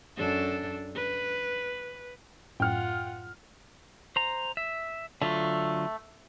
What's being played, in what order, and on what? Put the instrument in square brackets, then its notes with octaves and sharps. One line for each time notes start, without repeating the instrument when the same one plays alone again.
[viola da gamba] F#2 D4 A4
B4
[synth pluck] F#2 A2 [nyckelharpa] F4 F#5 [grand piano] G5 F6
[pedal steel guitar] C5 A#5
E5
[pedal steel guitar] D3 F#3 F4 [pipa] A3